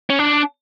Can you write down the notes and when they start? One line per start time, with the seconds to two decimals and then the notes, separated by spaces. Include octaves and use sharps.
0.10 C#4
0.19 D4